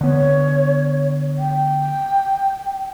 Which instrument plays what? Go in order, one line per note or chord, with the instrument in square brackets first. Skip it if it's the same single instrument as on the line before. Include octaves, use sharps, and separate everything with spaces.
[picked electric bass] D3 B3 [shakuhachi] C#5
[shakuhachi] G5